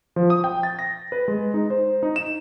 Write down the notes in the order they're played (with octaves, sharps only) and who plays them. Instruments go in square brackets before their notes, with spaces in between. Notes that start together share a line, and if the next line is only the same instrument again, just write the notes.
[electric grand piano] F3
D#6
G5
A6
A#6
B4
G#3
D#4
C5
D#4
E7